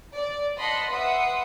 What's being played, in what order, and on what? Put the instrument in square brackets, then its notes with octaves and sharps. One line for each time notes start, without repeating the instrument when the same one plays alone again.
[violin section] D5
D#5 F#5 A5 B5 C6
B4 E5 F#5 C6 D#6